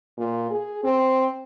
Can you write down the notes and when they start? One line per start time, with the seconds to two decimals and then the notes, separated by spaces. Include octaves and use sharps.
0.17 A#2
0.50 G#4
0.83 C4